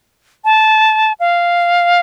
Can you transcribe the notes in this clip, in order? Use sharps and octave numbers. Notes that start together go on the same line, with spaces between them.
A5
F5